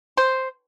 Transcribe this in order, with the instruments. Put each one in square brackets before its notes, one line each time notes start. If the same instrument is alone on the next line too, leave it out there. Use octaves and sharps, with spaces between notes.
[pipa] C5